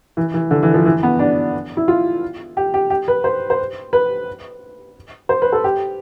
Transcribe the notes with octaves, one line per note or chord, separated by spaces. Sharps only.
E3
E3
D3
E3
F3
E3
B3
D4
E4
F4
G4
G4
G4
B4
C5
C5
B4
C5
B4
A4
G4